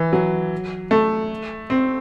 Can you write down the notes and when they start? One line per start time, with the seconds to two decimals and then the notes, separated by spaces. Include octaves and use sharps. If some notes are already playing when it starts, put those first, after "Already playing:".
Already playing: E3
0.13 F#3
0.91 A3
1.70 C4